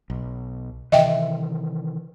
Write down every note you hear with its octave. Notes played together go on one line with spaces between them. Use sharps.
B1
C3 D#3 E3 D#5 E5 G5